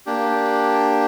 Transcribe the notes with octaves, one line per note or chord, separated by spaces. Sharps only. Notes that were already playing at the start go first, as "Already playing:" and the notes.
A#3 D4 G4